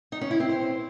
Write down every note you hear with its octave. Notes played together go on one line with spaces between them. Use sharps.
D#4
C#4
E4
C4
C5